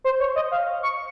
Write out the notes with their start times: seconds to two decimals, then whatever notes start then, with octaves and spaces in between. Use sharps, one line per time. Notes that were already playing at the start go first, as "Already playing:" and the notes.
0.04 C5
0.20 C#5
0.36 D#5
0.52 F5
0.83 C#6